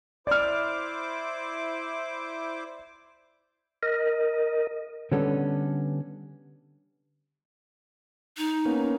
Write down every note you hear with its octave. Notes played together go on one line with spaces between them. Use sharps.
E4 C5 D5 D6 F6
A#4 D#5
D3 G3 B3 C#4 A4
D#4
A#3 B3 C#4